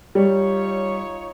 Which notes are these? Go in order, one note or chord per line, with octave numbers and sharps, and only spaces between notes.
G3 D#4 F4 C#5